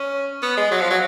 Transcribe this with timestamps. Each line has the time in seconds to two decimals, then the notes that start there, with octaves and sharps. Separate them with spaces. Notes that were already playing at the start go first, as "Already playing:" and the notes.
Already playing: C#4
0.42 B3
0.57 G#3
0.71 F#3
0.81 F3
0.90 F#3